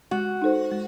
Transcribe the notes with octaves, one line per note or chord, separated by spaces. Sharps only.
G#3 F#4
D#4 A4 C5
G#3